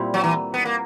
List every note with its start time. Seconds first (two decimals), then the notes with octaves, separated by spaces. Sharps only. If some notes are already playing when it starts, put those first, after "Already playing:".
Already playing: A#2 G3 C4 E4
0.14 F#3
0.24 E3
0.54 B3
0.65 A#3